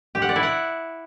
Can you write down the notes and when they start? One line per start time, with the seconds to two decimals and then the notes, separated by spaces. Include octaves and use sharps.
0.15 G4
0.22 F#5
0.29 D5
0.36 E4
0.43 F#5